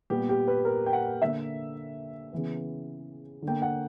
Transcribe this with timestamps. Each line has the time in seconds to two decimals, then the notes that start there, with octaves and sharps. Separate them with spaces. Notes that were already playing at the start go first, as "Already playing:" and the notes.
0.10 A#2 G3 B3 G4
0.29 G4
0.48 B4
0.65 A#4
0.86 G5
0.93 F#5
1.22 D3 A#3 E5
2.32 C#3 E3 B3
3.42 D3
3.47 A#3 G5
3.62 F#5